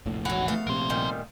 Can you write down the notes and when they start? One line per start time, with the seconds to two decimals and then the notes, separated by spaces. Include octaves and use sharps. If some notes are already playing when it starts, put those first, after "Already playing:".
0.06 F1 A#1 A2
0.25 D#3 E3 F#3 F#5
0.48 A3 B3 F5
0.67 A#1 C3 A#4 C6
0.90 A#2 D#3 G3